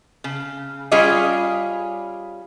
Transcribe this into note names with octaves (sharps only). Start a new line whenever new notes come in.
C#3
G3 C#4 F4 G#4 D5 D#5